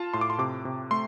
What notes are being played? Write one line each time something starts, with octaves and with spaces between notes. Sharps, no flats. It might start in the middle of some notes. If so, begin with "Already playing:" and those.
Already playing: F4 A5
A2 C6
D6
C6
C3 D6
C3
A3 C6